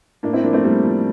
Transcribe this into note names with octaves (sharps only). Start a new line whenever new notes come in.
A2 A#3 D4
C4 E4
F3 A#3 D4
A3 C4
A2 G3 A#3
F3